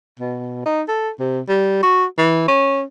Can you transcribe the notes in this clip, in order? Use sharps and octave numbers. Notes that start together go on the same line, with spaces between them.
B2
D#4
A4
C3
G3
F#4
E3
C#4